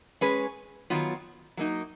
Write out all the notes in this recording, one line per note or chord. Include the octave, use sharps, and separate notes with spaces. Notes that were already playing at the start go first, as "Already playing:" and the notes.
G#3 C#4 G#4 B4
D#3 F#3 B3 F4
F#3 A#3 D#4